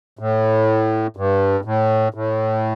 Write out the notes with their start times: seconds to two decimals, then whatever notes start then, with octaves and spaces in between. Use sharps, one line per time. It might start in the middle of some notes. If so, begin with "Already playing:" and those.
0.19 A2
1.17 G2
1.65 A2
2.14 A2